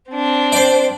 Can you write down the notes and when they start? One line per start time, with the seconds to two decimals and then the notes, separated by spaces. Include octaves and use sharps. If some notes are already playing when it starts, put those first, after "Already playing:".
0.10 C4 D4
0.52 C5 D5